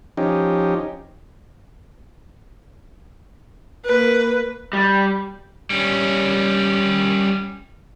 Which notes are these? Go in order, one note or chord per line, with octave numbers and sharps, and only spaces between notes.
F3 C#4 D#4 G4
A#3 B4
G3
G3 C#4